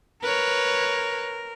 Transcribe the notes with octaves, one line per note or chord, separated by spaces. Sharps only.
A#4 B4 C#5